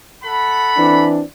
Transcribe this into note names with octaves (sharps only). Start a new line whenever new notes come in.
A4 F#5 B5
E3 C4 D4